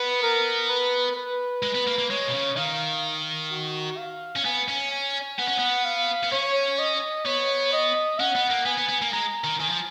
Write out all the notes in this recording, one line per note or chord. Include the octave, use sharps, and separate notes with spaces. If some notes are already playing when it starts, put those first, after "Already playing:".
Already playing: B3 B4
A#4
B4
B4
G#3
B3
A#3
A#3
G#3 C#5
B2
C#3
D#3 F5
F#4
F5
C#4
B3 G#5
C#4
G#5
B3 F#5
C#4
B3
F5
B3
C#4 C#5
D#5
B3 C#5
D#5
C#4 F#5
B3
A#3
B3 G#5
B3
B3
A#3
G#3 A#5
D#3
D#3 G#5
F3